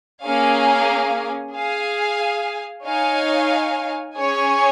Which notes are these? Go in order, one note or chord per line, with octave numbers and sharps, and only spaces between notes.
A#3 C#4 G#4 F5 G#5
G#4 F5 G#5
D#4 C#5 F5 G#5
C#4 G#4 C#5 G#5